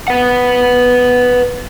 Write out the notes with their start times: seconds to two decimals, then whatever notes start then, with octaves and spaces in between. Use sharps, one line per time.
0.08 B4 F#5